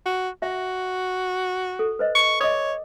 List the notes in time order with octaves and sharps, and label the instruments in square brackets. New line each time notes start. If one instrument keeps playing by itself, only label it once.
[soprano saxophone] F#4
[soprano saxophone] F#4 [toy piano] E5
[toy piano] A4
B4 C5 D#5
[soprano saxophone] C#6
[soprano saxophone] C#5 [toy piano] D#5 D6 D#6